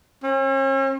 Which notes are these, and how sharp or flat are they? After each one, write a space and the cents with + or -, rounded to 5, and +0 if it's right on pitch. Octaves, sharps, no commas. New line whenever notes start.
C#4 -45